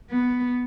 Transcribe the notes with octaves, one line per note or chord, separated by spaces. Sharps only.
B3